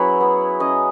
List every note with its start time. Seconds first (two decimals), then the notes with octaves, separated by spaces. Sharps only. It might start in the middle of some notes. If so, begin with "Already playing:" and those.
Already playing: F#3 C#4 E4 G#4 B4
0.21 B3
0.60 C#4 D#5